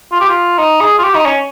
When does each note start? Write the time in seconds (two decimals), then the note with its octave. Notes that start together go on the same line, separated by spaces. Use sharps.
0.12 F4
0.20 G4
0.28 F4
0.58 D#4
0.81 G#4
0.98 F4
1.03 G4
1.15 D#4
1.26 C#4